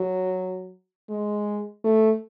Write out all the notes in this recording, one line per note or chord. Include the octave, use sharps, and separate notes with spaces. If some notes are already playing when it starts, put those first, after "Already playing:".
Already playing: F#3
G#3
A3